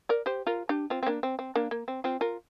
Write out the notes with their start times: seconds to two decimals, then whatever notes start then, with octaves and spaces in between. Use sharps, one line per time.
0.09 A#4 D5
0.26 G4 C5
0.47 F4 A#4
0.69 D4 G4
0.90 C4 F4
1.03 C4
1.06 A#3 D4
1.23 C4
1.39 C4
1.55 A#3 D4
1.71 A#3
1.88 C4
2.04 C4 F4
2.21 F4 A#4